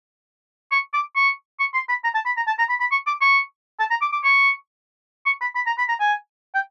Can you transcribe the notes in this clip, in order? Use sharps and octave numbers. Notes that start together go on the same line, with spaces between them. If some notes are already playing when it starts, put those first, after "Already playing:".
C#6
D6
C#6
C#6
C6
B5
A#5
A5
B5
A#5
A5
A#5
B5
B5
C#6
D6
C#6
A5
A#5
D6
D6
C#6
C#6
B5
B5
A#5
B5
A#5
G#5
G5